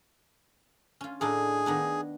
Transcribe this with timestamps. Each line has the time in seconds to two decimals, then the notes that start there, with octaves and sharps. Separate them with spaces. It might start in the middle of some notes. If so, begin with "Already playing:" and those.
1.01 C#4 F4
1.21 A2 D4 D#4 G#4
1.66 D#3 B3 D4